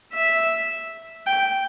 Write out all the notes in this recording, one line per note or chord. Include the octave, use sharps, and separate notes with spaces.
E5
G5